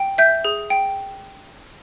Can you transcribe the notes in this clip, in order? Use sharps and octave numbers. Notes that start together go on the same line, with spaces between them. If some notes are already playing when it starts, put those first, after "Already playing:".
Already playing: G5
E5 G6
G#4
G5